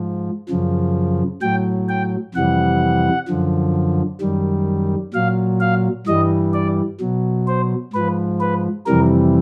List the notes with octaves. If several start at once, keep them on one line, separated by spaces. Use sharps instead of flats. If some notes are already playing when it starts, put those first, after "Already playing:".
Already playing: G#2 F3
F#2 C#3 F3
A2 F#3 G5
G5
F2 C3 E3 G3 F#5
F#2 D3 F3
F#2 D#3 G3
A#2 F#3 F5
F5
G2 E3 G3 D#5
D5
B2 F#3
C5
G#2 F3 B4
B4
F2 C3 E3 G3 A#4